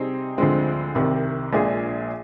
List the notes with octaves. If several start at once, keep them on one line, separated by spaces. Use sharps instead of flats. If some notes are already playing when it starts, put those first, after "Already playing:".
Already playing: C3 G3 C4 D#4 G#4
D2 D3 F3 G#3 C4
C2 C3 D#3
A#1 A#2 G#3 D4 G#4